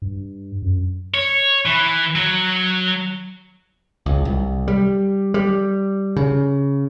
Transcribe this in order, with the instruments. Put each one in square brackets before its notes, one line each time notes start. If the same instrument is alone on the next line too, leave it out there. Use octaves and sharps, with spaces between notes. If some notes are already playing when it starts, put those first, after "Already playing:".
[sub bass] G2
F#2
[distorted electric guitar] C#5
E3
F#3
[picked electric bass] C#2
C2
G3
G3
C#3